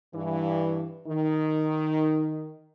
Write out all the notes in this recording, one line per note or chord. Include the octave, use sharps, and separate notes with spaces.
G2 E3
D#3